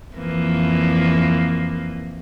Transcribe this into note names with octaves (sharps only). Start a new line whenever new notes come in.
F2 E3 A#3